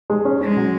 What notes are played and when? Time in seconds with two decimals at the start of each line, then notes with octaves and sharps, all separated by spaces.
0.10 G#3
0.25 C#4
0.41 G#3 C#4
0.57 F#3